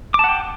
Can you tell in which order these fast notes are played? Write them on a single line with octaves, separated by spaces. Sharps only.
D6 A5 F#5 G5